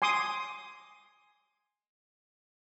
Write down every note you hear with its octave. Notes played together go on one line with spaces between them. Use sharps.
G#5 C6 D6 D#6